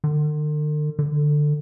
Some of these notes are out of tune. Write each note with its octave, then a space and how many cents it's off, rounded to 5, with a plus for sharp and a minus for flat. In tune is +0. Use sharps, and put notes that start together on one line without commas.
D3 +45
D3 +15